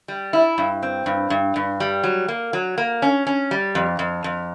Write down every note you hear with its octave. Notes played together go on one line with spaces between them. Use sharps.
G3
E4
G2
C4
G2
G2
G2
G3
F#3
A#3
F#3
A#3
C#4
C#4
G3
F2
F2
F2